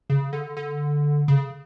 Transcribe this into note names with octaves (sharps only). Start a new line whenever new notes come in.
C#3
D3
D3
C#3